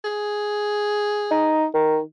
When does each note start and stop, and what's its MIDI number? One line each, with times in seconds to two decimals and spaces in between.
0.04 1.67 68
1.31 1.66 63
1.74 2.00 51